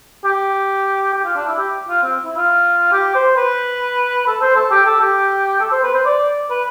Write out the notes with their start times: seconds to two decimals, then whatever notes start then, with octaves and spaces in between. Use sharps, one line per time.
0.24 G4
1.14 G4
1.25 F4
1.36 D4
1.47 E4
1.58 G4
1.89 F4
2.03 C4
2.25 E4
2.37 F4
2.92 G4
3.15 C5
3.36 B4
4.27 A4
4.41 C5
4.56 A4
4.71 G4
4.86 A4
5.01 G4
5.60 A4
5.72 C5
5.83 B4
5.94 C5
6.05 D5
6.50 B4